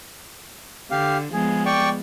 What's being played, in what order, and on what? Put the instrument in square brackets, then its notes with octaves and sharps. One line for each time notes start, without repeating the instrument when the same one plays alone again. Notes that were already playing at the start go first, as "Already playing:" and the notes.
[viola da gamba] D3 [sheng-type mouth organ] G4 F5
[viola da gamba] F3 G#3 B3 [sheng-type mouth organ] G#4
[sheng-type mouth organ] D5 G5 C#6